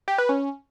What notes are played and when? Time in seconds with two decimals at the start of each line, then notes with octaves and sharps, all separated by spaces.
0.08 G4
0.18 B4
0.29 C#4